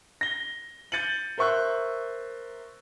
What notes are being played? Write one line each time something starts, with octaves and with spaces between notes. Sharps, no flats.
A#6 G7
G6 A6 C#7 D#7 F#7
A#4 C5 E5 C#6 E6 F#6